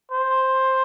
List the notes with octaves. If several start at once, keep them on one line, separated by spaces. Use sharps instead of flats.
C5